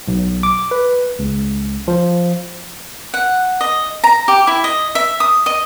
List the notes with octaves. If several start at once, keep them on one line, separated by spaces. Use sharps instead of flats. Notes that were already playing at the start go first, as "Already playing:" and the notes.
B1
D6
B4
C#2
F3
F#5
D#5
A#5
G4
E4
D#5
E5
D#6
D#5